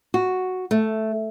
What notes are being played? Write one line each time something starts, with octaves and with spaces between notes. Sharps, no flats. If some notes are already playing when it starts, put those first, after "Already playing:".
F#4
A3